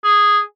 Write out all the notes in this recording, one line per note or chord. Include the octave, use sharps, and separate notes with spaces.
G#4